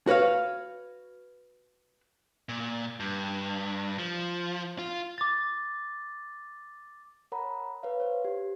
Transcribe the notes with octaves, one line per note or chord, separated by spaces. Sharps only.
F#4 B4 C#5 F5
A#2
G2
F3
F4
D6 A6
A#4 C#5 F#5 A#5 B5
B4 C#5 F5
C5 C#5
G4